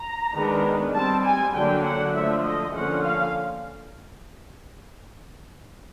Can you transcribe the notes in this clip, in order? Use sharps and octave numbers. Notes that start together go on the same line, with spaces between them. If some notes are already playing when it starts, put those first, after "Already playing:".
Already playing: A#5
D#3 G#3 B3 D4
G3 C4 A5
G#5
D3 F#3 A#3 D4 G5
F#5
D3 F3 A3 E5
D#5
D3 F3 A#3 C#4 F#5
F5